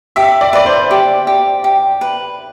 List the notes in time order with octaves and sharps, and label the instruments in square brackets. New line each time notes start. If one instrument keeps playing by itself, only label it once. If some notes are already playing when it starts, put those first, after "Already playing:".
[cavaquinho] G4 [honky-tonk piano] E5
[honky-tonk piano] D5
[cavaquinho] B4 [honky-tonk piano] D5
[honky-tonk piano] C5
[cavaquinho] G4
G4
G4
B4